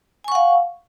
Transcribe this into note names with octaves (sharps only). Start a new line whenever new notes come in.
F5 F#5 G#5 C#6